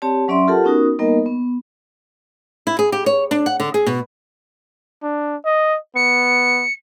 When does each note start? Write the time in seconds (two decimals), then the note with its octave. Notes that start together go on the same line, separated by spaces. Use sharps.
0.02 C4 G4 C#5 D5 A5
0.28 F#3 C#4 D5 E5 C6
0.48 F4 G4 A4 A#4 F#5 A5
0.64 B3 C#4 D#4 F#4 A#4 D#6
0.99 G3 A#3 B3 D#4 A#4 D#5
1.26 B3
2.67 E4
2.79 G#4
2.92 G4
3.06 C#5
3.31 D4
3.46 F#5
3.60 D3
3.74 G#4
3.87 B2
5.03 D4
5.45 D#5
5.96 B3 C#7